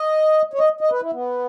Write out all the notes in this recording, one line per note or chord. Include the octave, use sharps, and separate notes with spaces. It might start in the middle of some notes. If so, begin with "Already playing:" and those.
Already playing: D#5
C#5
D#5
D#5
B4
E4
B3